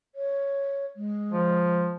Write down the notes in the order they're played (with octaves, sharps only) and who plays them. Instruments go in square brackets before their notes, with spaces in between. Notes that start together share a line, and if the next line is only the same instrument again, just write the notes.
[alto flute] C#5
G#3
[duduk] F3